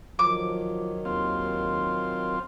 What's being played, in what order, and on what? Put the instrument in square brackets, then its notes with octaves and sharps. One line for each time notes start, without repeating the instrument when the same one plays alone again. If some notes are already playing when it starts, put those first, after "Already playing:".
[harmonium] D#3 F#3 [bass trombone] F3 [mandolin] D6
[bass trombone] D#2 [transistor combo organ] C4 F4